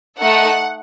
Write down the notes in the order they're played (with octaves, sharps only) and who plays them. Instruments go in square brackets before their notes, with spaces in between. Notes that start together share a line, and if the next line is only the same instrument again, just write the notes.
[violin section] A3 D#4 A4 F#5